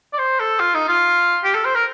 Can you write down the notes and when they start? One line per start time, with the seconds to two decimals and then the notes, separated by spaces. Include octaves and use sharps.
0.14 D5
0.18 C5
0.40 A4
0.60 F4
0.75 D#4
0.88 F4
1.44 G4
1.55 A4
1.65 C5
1.75 A#4